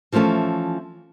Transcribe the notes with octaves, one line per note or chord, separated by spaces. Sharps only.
E3 F3 A3 C#4 A4